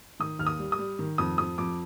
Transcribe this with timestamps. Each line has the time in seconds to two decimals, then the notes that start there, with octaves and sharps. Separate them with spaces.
0.20 D#3 D#6
0.39 D#2 F6
0.47 D#6
0.59 G3
0.72 D#6
0.79 G3
0.99 D#3
1.18 F2 D#6
1.38 F2 D#6
1.58 F2 D6